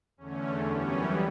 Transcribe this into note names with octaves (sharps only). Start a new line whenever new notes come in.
E2 D3 A3 C#4
F#2 E3 G3 B3 C#4